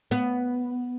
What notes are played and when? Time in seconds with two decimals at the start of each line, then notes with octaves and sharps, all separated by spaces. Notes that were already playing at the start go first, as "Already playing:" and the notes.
0.11 B3